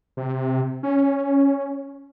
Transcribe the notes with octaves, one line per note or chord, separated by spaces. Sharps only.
C3
C#4